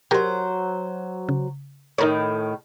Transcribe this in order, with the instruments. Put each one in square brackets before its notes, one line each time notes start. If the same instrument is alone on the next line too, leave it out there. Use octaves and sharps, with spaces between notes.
[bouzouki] F#3 C5 [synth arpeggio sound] G4 A#4
[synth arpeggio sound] C#3
[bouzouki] A2 D#3 [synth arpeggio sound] D#4 A#4 C#5